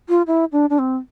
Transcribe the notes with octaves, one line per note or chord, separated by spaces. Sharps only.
F4
E4
D4
D4
C4